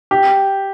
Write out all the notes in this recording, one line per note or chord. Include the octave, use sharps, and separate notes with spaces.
G4